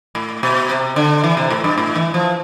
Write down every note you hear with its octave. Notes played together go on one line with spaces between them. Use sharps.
A2
B2
C3
D3
E3
C3
A2
G2
A2
E3
F3